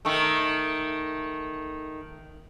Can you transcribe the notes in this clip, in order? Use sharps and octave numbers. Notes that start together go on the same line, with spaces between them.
D#3 A3